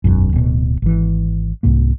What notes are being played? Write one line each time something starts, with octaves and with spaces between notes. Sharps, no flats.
E1 B1 F#2
D1 B2
G#1 E3
C2 G#2 C3 A#3